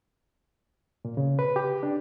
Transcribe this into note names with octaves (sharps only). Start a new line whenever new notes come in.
A#2
C#3
B4
G4
D4